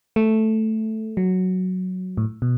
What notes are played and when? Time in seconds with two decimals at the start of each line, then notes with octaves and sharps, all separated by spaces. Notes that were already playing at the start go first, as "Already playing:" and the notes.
0.16 A3
1.17 F#3
2.17 A2
2.42 B2